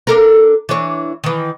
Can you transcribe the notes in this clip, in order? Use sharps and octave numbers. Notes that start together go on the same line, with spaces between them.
D4 A4 A#4
E3 D4 C#5
D#3 E3